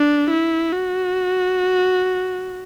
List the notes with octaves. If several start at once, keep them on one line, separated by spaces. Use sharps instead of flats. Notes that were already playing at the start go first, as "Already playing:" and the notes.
Already playing: D4
E4
F#4